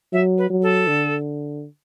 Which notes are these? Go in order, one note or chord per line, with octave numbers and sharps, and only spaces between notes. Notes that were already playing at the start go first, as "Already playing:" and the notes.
F#3 E5
B4
F#3
A4
D3